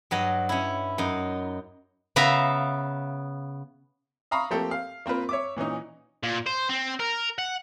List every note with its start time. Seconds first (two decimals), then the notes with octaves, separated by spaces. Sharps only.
0.11 G2 F#3 D#5 A5
0.49 C#4 E4
0.98 F#2 D#4
2.16 C#3 B3 E5 F5 A#5
4.31 E5 F5 A#5 B5 C#6 D#6
4.50 F3 A3 A#3 C4 G4 A4
4.71 F5
5.06 A#3 C4 F4 B4
5.29 C#5 E5 D6
5.56 A#2 E3 C#4 D#4
6.23 A#2
6.46 C5
6.69 C4
7.00 A#4
7.38 F#5